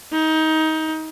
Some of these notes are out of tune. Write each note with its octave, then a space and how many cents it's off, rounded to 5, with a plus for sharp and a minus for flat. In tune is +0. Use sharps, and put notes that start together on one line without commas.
D#4 +20